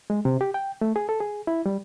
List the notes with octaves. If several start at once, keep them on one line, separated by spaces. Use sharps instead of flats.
G#3
C3
G4
G5
A3
G#4
A4
G#4
E4
G3